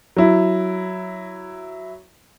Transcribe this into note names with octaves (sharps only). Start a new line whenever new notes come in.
F#3 E4